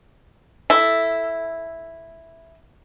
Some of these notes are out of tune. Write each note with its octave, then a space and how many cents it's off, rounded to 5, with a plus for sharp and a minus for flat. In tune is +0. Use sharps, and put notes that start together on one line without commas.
E4 +0 A4 +0